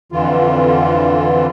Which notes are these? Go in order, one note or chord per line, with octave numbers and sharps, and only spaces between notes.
F2 D3 E3 F4